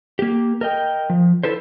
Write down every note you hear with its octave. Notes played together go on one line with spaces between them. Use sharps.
A#3 G4
A#4 D#5 G5
F3
E4 A4 B4 C5